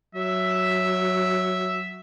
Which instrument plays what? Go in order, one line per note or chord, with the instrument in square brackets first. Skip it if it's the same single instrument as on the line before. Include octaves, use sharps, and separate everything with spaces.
[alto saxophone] F#3 [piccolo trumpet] E5